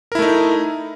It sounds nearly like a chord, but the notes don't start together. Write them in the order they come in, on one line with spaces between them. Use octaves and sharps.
A#4 E4 A3 D#4